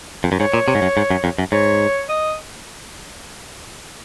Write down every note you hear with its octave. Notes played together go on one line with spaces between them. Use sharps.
F2
F#2
G#2 C#5
A#2
C3
G#2
F#2
G#2
F#2
F2
F#2
G#2 C#5
D#5